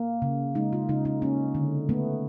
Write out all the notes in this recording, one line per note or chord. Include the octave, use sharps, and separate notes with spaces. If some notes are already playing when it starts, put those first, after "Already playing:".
Already playing: A#3
C#3
G#3 D#4
F4
C#3 D#4
D#4
A#3 C#4
D3
A3 B3